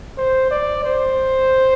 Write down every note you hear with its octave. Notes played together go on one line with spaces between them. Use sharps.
C5
D5
C5